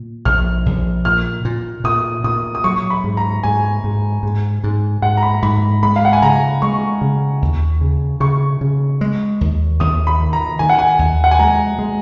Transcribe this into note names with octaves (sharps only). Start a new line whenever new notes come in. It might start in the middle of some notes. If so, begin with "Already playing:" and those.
Already playing: A#2
A#1 F6
A#1
A#2 F6
A#2
A#2 D#6
A#2 D#6
D#6
F#3 C#6
B5
G#2
A#5
G#2 G#5
G#2
G#2
G#2
G#2 F#5
A#5
B5
G#2 B5
G#3 B5
F5
F#5
G#5
C#3 A#5
G#3 C#6
C#3
D#2
C#3
C#3 C#6
C#3
G#3
D#2
D#2 D#6
B5
D#3
A#5
D#3 G#5
F#5
G#5
D#2
F#5
G#5
G#3 A#5
G#3